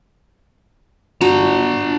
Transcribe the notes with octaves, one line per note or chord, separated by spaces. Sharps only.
D4 F#4 A#5